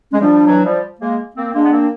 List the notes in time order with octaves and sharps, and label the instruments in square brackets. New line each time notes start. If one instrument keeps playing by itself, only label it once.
[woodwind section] G#3 [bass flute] C#4
[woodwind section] F3 G3 [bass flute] D4
[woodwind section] E3 F#3
F3 G3
G#3 A#3
A#3 C4
[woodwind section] G#3 A#3 [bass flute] D4
[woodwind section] B3
A#3 C4